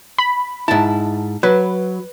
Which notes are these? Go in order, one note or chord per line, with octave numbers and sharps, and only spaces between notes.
B5
G#2 E4 A5
F#3 B4